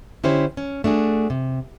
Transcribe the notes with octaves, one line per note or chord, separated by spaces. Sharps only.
D3 C#4 E4 G4 C5
C#4
A3 D4 F#4 G#4
C3